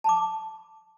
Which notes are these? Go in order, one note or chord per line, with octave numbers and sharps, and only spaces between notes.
A5 B5 D6